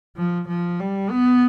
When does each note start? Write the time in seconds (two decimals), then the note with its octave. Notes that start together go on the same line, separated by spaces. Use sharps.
0.17 F3
0.48 F3
0.80 G3
1.10 B3